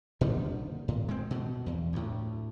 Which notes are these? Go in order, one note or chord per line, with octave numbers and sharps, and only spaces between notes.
A#2 D3 D#3 G3
A2
G#3 C4
B2
E2
D2 A2